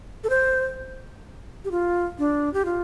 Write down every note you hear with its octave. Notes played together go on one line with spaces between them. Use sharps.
A4
C5
G4
F4
D4
G4
F4